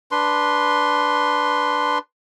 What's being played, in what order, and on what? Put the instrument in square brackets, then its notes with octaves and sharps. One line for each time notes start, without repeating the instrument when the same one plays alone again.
[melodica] D4 B4 C6